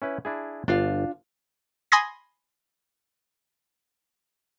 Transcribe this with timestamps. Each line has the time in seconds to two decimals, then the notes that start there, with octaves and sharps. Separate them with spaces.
0.02 C#4 E4 B4
0.25 D4 E4 G#4
0.68 G1 D4 F4 F5
1.92 G#5 B5 C6 D#6 G#6 A#6